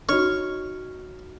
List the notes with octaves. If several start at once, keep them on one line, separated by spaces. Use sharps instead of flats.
D#4 F#4 C#5 F6